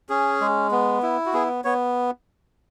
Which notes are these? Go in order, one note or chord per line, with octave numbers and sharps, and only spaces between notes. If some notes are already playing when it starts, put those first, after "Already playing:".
C#4 G#4
G#3
B3
E4
F#4
B3 G#4
B3 C#5